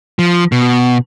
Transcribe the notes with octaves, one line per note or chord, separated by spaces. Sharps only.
F3
B2